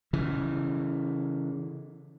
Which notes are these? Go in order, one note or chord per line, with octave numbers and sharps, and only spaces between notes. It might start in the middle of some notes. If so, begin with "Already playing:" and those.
C#3 E3